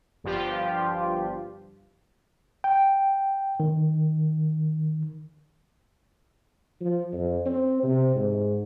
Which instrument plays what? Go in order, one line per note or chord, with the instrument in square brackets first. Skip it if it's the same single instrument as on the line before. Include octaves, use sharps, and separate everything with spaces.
[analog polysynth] G1 G2 F3 F4 G4
[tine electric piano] G5
D#3
[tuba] F3
F2
C4
C3
G#2